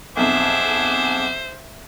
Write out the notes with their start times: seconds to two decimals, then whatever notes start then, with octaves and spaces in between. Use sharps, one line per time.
0.17 B1 F2 G#4 C5 E5 F#5 D6